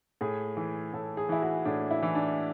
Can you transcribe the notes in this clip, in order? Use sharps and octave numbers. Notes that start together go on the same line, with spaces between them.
A2 G#4
E3
A2 A4
G#4
E3 E4
F#4
A2 D4
E4
E3
D4